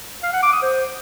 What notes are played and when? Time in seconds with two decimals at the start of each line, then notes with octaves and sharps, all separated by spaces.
0.23 F5
0.33 F#5
0.43 D6
0.53 D#6
0.63 C5